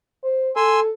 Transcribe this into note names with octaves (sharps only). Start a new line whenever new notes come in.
C5
A4 G#5 C6 E6